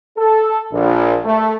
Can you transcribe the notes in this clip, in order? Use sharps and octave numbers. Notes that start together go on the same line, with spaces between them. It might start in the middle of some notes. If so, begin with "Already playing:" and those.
A4
A#1
A3